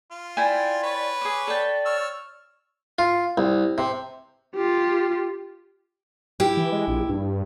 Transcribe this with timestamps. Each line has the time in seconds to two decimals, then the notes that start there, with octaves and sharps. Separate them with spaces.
0.11 F4
0.37 E4 D5 G5 G#5
0.83 B4 C#5
1.21 G#4 D6
1.47 A4 D5 G5
1.86 C#5 E6 F6
2.99 F4
3.38 C2
3.78 C3
4.55 F4 G4
6.40 E4 G4
6.57 E3
6.72 G#3
6.88 A#1
7.09 G2